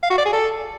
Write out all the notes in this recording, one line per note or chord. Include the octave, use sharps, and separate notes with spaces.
F5
F#4
D5
G#4
A4